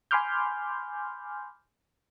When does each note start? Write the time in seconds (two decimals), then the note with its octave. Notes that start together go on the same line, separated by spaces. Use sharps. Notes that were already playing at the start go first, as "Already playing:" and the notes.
0.11 G#5 B5 C6 D6 F6 G6